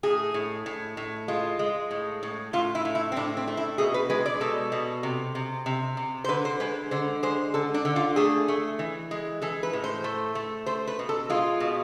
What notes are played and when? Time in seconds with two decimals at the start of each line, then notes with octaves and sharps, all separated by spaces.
0.03 A2 G#4
0.34 A2
0.66 A2
0.97 A2
1.28 G#3 F4
1.59 G#3
1.91 A2
2.23 A2
2.53 A2 F4
2.75 E4
2.85 A2
2.95 E4
3.12 C4
3.16 A2 D4
3.37 C4
3.47 A3
3.57 E4
3.78 B2 G#4
3.94 B4
4.10 G#3 B4
4.26 D5
4.41 B2 A4
4.72 B2
5.03 C3
5.35 C3
5.66 C3
5.97 C3
6.24 C5
6.28 D3 B4
6.45 C5
6.60 G#3 B4
6.91 D3 C5
7.23 G#3 C5
7.54 D3 A4
7.74 D4
7.85 D3
7.96 F4
8.16 A3 G#4
8.48 A3
8.79 E3
9.11 G#3
9.42 E3 A4
9.63 B4
9.73 A2
9.84 C5
10.04 A3
10.35 A3
10.66 A3 C5
10.87 B4
10.99 B2
11.09 A4
11.30 G#3 F4
11.60 B2